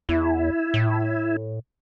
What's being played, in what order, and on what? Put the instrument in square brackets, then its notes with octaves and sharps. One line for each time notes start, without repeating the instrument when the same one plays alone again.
[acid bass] E2 [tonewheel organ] E4
[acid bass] A2